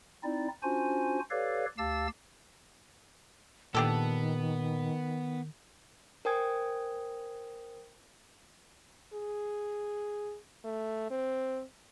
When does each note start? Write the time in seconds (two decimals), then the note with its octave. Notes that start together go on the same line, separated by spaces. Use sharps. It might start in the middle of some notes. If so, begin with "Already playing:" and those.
0.23 C4 D#4 E4 D5
0.63 C#4 D4 F4 F#4 C5 G#5
1.30 G4 A4 B4 C#5 D5 F5
1.78 D2 G4 F5 A5 E6 A6
3.75 A#2 D#3 B3 D4 G4 A4
6.25 A#4 C5 G5 G#5 D#6 G#6
9.14 G#4
10.64 A3
11.11 C4